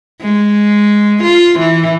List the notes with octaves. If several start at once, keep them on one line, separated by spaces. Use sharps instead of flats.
G#3
F4
E3